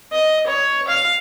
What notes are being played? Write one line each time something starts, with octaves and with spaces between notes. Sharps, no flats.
D#5
C#5
F5